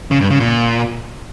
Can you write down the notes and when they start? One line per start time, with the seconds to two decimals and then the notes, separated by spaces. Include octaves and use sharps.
0.11 C#3
0.21 G2
0.30 C#3
0.40 A#2